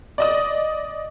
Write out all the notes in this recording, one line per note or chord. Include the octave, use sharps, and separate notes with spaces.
D5 D#5 D#6